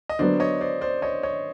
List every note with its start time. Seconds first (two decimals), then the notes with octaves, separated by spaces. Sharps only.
0.09 D#5
0.19 D3 F#3 B3 C5 D5
0.40 C#5 D#5
0.61 C5 D5
0.81 C5 D5
1.02 C#5 D#5
1.23 C#5 D#5